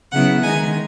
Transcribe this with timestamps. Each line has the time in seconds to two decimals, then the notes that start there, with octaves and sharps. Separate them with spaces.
0.12 C#3 F#3 B3 E4 F#5
0.42 D#3 G#3 D#4 G#5